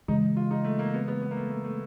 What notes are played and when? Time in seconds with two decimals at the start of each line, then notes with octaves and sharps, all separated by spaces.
0.08 C#3 E3 G#3 D#4
0.37 F4
0.51 D#4
0.65 A3
0.79 A#3
0.94 B3
1.08 B3
1.22 B3
1.31 A#3
1.36 A3
1.50 A3
1.64 A3